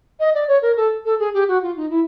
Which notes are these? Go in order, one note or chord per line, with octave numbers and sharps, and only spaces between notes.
D#5
D5
C#5
A#4
A4
A4
G#4
G4
F#4
F4
D#4
E4